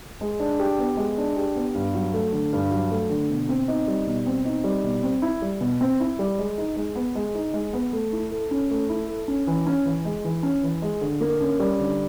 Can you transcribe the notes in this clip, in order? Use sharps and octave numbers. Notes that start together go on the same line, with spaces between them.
G#3
D4
G4
B3
G#3
D4
G4
B3
G2
F#3
A3
D3
G2
F#3
A3
D3
B2
C4
D#4
G3
B2
C4
D#4
G3
B2
C4
E4
G3
B2
C4
E4
G3
G#3
D#4
G#3
B3
G#3
D#4
G#3
B3
A3
E4
A4
C#4
A3
E4
A4
C#4
E3
C#4
E3
G#3
E3
C#4
E3
G#3
D3
A#3
C#4
G3
D3